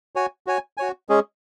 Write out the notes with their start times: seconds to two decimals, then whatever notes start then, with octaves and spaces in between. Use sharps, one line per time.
0.15 F#4 C#5 G#5
0.47 F#4 C#5 G#5
0.77 F#4 C#5 G#5
1.09 G#3 C#4 G#4